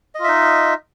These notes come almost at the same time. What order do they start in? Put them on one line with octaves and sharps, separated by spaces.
D#5 F4 E5 D#4